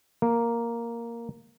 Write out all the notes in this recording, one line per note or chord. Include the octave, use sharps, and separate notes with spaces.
A#3